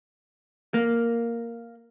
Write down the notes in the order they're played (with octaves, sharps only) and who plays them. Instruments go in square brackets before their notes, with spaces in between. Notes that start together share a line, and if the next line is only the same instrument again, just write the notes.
[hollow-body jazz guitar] A#3